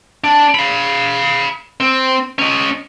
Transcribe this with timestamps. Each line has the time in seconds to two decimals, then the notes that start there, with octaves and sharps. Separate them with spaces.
0.24 D4
0.55 F5 B5
1.80 C4
2.39 C#4 D#5